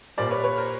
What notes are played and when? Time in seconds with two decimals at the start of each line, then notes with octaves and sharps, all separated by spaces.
0.17 A#2 G3 A#3 C5 D5
0.31 B4 C#5
0.44 B4 C#5
0.57 A#4 C5